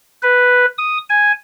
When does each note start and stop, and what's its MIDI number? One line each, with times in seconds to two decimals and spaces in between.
0.22 0.65 71
0.78 0.98 87
1.10 1.32 80